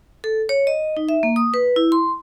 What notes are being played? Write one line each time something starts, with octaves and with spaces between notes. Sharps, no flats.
A4
C#5
D#5
D#4
E5
A#3
D#6
B4
E4
C6